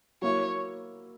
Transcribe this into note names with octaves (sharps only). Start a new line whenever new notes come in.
F#3 A#3 E4 C#5